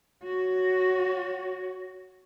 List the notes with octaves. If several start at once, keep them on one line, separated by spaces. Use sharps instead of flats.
F#4 C#5